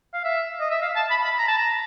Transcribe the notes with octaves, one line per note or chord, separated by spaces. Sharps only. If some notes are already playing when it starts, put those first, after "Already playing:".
F5
E5
D#5
E5
F5
A5
B5
B5
A#5
A5
A#5